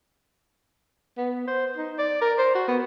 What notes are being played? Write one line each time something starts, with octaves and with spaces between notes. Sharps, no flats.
B3
C5
D#4
D5
A#4
C5
F#4
B3